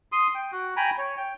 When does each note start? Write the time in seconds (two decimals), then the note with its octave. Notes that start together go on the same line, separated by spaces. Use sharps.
0.12 C6 D#6
0.35 G5
0.52 F#4
0.77 G5 G#5 A#5 B5
0.98 C#5
1.17 G5